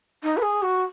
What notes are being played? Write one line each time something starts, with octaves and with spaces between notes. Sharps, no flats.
D#4
B4
G#4
F#4